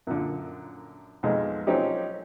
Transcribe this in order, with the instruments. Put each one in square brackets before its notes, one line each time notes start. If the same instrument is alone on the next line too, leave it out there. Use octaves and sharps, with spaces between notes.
[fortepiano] F#2 A#2 D3
B1 F2 G#3 D#5
F3 F#3 C4 C#4 D#4 G4